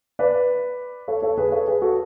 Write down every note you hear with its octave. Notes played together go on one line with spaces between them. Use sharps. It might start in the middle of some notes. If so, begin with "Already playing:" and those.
B4 D5
A4 C#5
A4 C#5
G#4 B4
A4 C#5
G#4 B4
F#4 A4